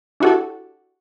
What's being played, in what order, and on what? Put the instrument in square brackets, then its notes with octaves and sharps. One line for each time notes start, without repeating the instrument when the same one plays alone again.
[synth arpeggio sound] D4 E4 F#4 G4 A4